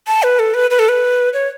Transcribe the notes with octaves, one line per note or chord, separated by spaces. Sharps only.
A5
B4
A4
B4
B4
A4
B4
C#5